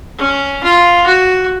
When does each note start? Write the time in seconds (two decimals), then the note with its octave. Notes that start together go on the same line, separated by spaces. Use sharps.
0.18 C#4
0.63 F4
1.06 F#4